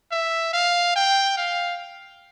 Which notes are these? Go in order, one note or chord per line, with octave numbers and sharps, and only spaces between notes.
E5
F5
G5
F5